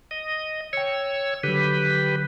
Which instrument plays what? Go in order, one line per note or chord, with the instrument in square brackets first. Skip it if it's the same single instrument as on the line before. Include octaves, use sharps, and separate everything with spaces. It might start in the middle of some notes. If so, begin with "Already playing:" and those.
[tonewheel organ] D#5
[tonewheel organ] C#5 E6 [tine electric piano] G5 C#7
[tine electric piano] D3 F#3 [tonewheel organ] G4 B4